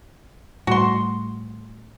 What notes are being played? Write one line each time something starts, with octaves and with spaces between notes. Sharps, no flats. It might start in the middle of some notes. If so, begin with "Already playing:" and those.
A2 G3 A3 F#4 C6